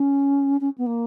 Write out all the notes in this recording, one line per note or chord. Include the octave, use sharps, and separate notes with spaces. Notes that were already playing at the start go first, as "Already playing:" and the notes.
Already playing: C#4
C#4
B3
A#3